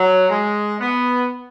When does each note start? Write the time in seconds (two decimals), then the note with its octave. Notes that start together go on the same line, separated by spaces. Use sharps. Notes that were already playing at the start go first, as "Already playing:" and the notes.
Already playing: F#3
0.30 G#3
0.80 B3